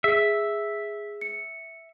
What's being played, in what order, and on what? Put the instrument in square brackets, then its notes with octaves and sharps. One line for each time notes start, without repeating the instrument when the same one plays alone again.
[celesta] G#4 [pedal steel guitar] E5
[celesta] C#7